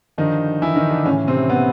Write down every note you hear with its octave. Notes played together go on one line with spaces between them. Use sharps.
G2 D3 D#3 F3 D#4
E3 E4
D#3 D#4
D3 D4
A2 C#3 E3 C#4
C3 C4
B3